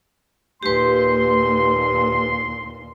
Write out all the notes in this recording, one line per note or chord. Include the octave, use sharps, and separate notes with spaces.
D#2 A#2 G4 B4 C6